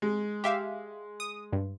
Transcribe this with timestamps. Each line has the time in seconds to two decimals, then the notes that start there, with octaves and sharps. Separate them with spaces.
0.02 G#3
0.44 G4 E5 F5
1.20 D#6
1.53 G2